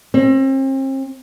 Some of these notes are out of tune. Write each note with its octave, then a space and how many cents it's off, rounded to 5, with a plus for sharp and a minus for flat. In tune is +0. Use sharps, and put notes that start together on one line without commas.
C4 +40